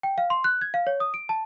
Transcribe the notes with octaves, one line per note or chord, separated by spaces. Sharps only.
G5
F5
C6
F#6
G#6
F5
C#5
D#6
D7
A5